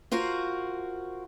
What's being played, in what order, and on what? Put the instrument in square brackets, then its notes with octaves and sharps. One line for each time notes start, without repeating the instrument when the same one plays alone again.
[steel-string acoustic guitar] F4 F#4 A#4 C5